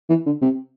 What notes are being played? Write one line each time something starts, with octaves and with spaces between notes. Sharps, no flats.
E3
D3
C3